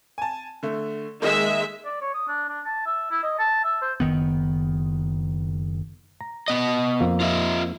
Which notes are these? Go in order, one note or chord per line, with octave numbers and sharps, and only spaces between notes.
G#5 A5
D3 A3
D#3 G#3 A#3 D#4 E5
D5
C#5
D#6
D4
D4
A5
E5
E4
D#5
A5
E5
C5
F#1 D#3 B3
A#5
B3 D#5
F2 A#3
F4 D#5 E5